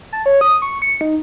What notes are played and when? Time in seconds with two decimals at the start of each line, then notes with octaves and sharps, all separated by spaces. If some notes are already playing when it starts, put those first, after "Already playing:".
0.13 A5
0.26 C#5
0.41 D#6
0.62 C#6
0.82 C#7
1.01 D#4